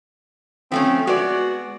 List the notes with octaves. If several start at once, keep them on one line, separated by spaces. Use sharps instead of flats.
F3 A3 C4 C#4
G#3 B3 F#4 D5